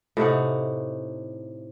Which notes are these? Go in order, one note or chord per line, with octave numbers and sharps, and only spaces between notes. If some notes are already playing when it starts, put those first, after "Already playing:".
A2 C3 D#4 F#5